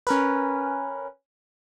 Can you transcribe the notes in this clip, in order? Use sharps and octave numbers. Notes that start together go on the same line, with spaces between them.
C#4 A#4 B4